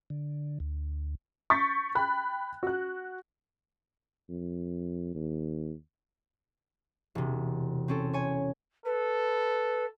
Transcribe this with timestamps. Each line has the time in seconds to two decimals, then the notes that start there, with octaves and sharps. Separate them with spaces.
0.10 D3
0.60 D2
1.50 C#6 G6 A6 B6
1.95 G5 B5 F#6
2.63 F#4 F#6
4.29 F2
5.15 D#2
7.15 E1 C3
7.88 C4 C#4 A4
8.13 C#5 G#5
8.85 A4 B4